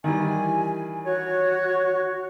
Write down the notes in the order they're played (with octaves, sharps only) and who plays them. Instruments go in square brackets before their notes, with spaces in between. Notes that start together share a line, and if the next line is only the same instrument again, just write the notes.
[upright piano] D#3 E3 G3 [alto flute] G#5
[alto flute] F#4 [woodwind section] C#5